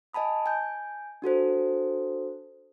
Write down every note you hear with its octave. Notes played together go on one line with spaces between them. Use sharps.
D#5 G#5 A5 B5 D#6
G#5 G6
D4 F#4 A4 C5